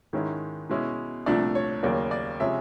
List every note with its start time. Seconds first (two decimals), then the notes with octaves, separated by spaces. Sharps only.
0.13 G#2 D#3 G#3 C#4 E4
0.70 B2 G#3 C#4 E4
1.26 C2 A#2 F3 A3 D4 D5
1.55 C#5
1.83 D#2 C#3 F#3 A#3 D5
2.11 D5
2.40 C3 F3 G#3 C#4 E5